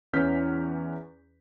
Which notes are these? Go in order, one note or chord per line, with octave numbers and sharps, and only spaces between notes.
E2 E3 C#4 F6 G6 B6